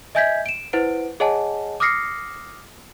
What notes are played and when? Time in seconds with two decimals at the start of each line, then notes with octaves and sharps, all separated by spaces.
0.15 D#5 E5 G#5 G6 G#6 B6
0.46 D7 E7
0.73 E4 B4 C5 F#5 D7
1.20 G#4 C#5 D#5 F#5 G#5 A5
1.80 D6 D#6 F6 A#6 C7 C#7